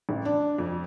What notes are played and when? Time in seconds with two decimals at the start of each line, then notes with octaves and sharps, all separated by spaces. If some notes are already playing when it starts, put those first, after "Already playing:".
0.09 A1
0.25 D4
0.58 F2